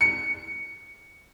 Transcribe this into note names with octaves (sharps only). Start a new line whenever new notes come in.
C#7